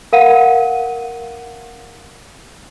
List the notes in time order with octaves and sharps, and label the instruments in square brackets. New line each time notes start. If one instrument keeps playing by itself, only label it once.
[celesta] A#4 F5 F#5 D#7